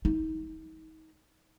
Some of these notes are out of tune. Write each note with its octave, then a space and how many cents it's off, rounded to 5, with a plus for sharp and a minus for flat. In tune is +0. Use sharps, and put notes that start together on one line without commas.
D#4 +30